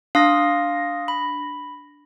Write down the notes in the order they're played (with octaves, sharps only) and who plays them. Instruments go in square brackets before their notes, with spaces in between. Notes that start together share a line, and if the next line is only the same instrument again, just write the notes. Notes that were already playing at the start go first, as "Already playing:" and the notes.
[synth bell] D4 A#6 [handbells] F5 C6 D#6
[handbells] B5